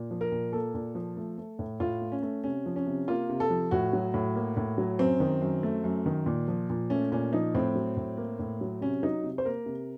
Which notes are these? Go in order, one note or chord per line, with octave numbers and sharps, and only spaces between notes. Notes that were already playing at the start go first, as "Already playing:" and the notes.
Already playing: A#2
F3
A#4
A#2
A#3 A4
A#2
F3
A3
A3
A2
A2 F4
A3
C#4
A3
C3 C#4
F3
C#4
C3
A#3 F4
C3
A4
F3
A2 F#4
F#3
A2
A#3
A2
F#3
F#2 C4
D#3
F#2
A3
F#2
D#3
A#2
F3
A#2
A3 C#4
A#2 C#4
F3 D#4
A2 C4
F#3
A2
A#3
A2
F#3
C3 C#4
F#3 D#4
C3
C5
A#3 A#4
C3